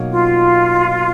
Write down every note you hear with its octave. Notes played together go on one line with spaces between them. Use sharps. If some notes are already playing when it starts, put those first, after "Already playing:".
Already playing: B2 F#3 A#3 D#4
F4